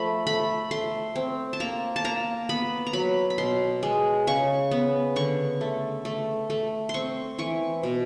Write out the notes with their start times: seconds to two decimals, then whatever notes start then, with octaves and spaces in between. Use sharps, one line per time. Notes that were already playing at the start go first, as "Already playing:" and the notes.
Already playing: F3 A3 B5
0.27 A3 B5
0.71 A3 C6
1.16 C4
1.53 A5
1.60 A#3 A#5
1.96 A5
2.04 A#3 A#5
2.49 B3 B5
2.87 A#5
2.93 F#3 B5
3.30 B5
3.38 B2 C6
3.83 G#3
4.27 C#3 C#6
4.71 B3
5.16 D3 C#6
5.61 A3
6.05 A3
6.50 A3
6.89 C6
6.94 C4 C#6
7.38 E3 C#6
7.83 B2